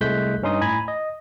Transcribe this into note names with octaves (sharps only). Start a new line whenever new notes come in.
C2 G#3 A3 F#6 G6 B6
G2 C#4 D#4 C6 D#6
A2 G#5 A#5 B5 G#6
D#5